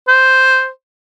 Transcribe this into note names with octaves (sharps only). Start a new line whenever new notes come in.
C5